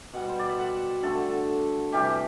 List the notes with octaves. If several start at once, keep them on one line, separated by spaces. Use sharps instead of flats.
B2 G3 F#5
C5
D5
E5
F#5
D3 A3 A4
C3 E3 G3 G4